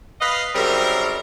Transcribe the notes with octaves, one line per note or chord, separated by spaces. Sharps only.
B4 D#5 F5
F#2 C#3 G3 C4 D#4 A#4